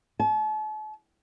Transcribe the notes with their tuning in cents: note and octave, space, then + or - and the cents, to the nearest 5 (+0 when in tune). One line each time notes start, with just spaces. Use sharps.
A5 -40